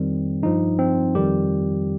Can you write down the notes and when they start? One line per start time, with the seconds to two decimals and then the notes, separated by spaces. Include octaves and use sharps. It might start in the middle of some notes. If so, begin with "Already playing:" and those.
Already playing: F2 D#3 G3 C4
0.43 G2 F3 D#4
0.79 C4
1.15 F2 D#3 G3 G4